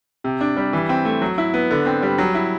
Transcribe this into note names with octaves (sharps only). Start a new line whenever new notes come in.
C3
D4
G3
E3
C4
A3
F#3
E4
B3
D3
C4
G3
F#3
E4